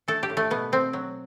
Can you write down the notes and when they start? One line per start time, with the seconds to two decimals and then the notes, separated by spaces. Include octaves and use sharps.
0.08 A3 A4
0.23 G4
0.30 A2
0.37 A3
0.51 B2 B3
0.72 B2 C4
0.93 F#3